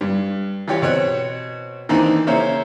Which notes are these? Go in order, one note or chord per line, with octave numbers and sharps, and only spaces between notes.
G2
E3 F4 G4 C#5
B2 C4 C#5 F#6
D#3 E3 A#3 C4 D4 D#4
C#3 A#3 E4 C5 C#5